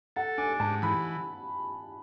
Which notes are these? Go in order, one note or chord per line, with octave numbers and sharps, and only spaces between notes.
A4 F#5
D4 G#5
G#2 A5
E3 B5